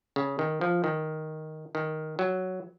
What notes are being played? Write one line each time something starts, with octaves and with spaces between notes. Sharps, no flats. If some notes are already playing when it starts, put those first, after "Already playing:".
C#3
D#3
F3
D#3
D#3
F#3